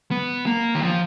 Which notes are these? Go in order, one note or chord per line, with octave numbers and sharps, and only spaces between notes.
B3
A#3
D#3
F3